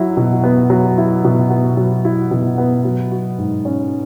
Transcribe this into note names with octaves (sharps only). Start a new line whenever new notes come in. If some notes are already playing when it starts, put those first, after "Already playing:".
Already playing: F#3 E4
B2
B3
F#3
E4
B2
B3
F#3
E4
B2
B3
F#3
F#4
G#2
C#4